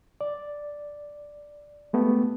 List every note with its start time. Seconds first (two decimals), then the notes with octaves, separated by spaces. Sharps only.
0.21 D5
1.93 G#3 A3 B3 G4